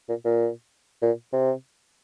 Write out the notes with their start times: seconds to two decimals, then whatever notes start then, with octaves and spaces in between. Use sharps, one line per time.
0.09 A#2
0.25 A#2
1.02 A#2
1.33 C3